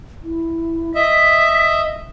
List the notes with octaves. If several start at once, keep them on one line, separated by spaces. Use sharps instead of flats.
E4
D#5 E5 B6